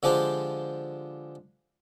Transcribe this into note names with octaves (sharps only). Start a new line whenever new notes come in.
D3 F3 G#3 D4 G4 C5